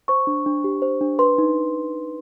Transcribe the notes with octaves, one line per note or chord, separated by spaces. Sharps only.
C5 C#6
D4
D4
G4
C5
D4
B4 C6
D#4